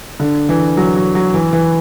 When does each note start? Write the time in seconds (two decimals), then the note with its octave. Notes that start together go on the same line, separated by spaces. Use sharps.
0.20 D3
0.49 E3
0.77 F#3
0.96 F#3
1.15 F#3
1.34 E3
1.53 E3